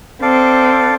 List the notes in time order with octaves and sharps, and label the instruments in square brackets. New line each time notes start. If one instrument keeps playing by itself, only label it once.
[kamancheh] C4 [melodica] A4 D5 F5